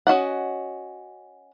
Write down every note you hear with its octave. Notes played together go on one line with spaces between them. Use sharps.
C#4 F#4 D#5 F#5